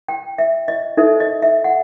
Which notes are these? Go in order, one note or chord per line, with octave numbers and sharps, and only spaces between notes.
G5
E5
D#5
D#4 A4 C5 E5
D#5
E5
F#5